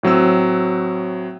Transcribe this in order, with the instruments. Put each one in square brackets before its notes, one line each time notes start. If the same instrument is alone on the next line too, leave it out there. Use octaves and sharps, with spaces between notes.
[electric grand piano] A2 F#3 C4 E6